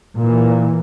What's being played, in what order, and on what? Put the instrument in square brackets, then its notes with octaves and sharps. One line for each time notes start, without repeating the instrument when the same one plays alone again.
[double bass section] A#2 E3